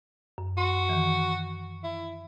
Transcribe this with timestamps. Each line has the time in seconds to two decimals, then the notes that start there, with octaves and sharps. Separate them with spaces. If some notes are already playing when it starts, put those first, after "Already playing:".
0.38 F#2
0.57 F#4 C6
0.89 D#3 E3
1.84 E4